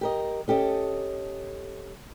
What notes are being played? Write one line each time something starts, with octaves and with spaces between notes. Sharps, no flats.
G4 A#4 D#5
C#4 G4 A4 D#5